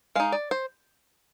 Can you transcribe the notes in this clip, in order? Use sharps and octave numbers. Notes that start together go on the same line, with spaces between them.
G#3 D#4 F5
D5
C5